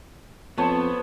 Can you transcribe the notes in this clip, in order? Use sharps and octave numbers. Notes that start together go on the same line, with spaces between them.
F2 B3 C5 C#5 A5